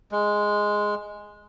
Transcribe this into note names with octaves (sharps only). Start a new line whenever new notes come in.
G#3